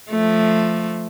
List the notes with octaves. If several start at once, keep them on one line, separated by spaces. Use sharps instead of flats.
F3 A3